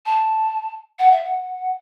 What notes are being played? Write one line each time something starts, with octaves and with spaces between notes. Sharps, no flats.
A5
F#5
E5
F#5